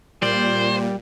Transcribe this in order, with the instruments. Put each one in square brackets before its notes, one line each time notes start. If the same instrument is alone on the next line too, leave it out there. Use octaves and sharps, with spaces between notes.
[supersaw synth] A#2 [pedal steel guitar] G3 D5 [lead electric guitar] C5